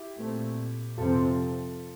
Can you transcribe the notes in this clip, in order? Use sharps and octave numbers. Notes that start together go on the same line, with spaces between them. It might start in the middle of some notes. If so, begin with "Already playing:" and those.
Already playing: E4 G4
A#2 A3 C4
F2 C3 F3 C4 F4 A4